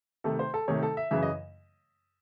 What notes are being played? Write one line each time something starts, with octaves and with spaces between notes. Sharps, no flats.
C3 D#3 A3 A4
C5
A4
C3 D#3 A3 C#5
A4
E5
F#2 C#3 E3 E5
D#5